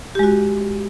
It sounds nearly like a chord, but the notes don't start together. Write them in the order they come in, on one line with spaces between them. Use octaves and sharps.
G4 G#3 F#4